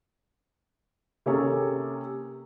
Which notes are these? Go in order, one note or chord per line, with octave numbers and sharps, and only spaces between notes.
C3 A#3 C#4 G#4 A4